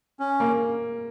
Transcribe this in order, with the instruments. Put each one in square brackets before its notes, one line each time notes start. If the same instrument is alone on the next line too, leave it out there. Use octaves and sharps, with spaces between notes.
[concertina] C#4
[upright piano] A#3